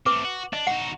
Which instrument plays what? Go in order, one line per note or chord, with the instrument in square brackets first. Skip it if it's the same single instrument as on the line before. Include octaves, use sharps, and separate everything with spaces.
[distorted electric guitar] A3 C4 [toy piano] B4 D6
[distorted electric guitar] F#4
[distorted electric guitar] D4 [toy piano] D#5
[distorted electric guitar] D#4 F#4 [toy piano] F#5